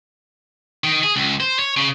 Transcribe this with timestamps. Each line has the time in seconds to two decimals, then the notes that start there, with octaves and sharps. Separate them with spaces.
0.84 D#3
1.03 G#4
1.16 C#2
1.40 C5
1.59 C#5
1.77 C#3